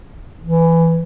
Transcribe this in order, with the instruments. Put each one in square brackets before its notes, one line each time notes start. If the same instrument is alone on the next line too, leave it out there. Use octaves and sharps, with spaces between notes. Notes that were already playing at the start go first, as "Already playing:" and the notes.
[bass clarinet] E3